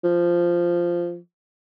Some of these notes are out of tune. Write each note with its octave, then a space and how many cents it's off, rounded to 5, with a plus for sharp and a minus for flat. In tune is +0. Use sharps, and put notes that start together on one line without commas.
F3 -10